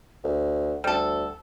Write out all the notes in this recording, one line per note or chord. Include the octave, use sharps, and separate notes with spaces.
D2
D2 G3 A4